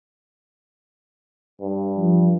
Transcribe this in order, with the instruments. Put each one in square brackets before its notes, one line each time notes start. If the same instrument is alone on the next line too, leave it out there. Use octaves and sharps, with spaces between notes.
[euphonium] G2
[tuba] F3